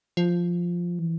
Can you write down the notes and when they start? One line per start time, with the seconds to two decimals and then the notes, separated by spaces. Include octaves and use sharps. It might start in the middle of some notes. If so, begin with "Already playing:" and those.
0.17 F3
0.99 E3